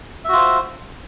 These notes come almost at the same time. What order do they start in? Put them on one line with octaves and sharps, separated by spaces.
E5 F#4 F4 C5